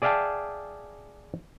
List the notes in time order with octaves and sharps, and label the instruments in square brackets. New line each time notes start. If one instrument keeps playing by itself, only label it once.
[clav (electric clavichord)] G#4 D5 E5 F5 G5 A5